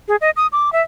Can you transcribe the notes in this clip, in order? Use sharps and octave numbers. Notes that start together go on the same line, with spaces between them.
G#4
D#5
D#6
D6
E5